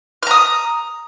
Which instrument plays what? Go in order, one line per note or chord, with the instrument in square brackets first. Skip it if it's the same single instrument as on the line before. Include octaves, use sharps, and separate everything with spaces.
[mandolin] F6
A#5
D#6